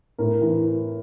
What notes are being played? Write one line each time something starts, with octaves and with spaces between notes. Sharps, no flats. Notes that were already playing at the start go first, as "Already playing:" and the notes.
A2 A#4
E3